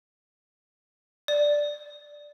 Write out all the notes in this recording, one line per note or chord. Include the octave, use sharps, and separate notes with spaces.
D5